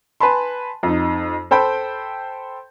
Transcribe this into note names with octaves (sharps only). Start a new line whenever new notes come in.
B4 G#5 A5 B5 C6
F2 D#4
A4 C5 G5 B5 G6